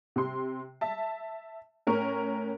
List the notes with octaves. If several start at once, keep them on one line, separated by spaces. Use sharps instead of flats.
C3 C6
E5 A5
A2 C#4 A#4 C#6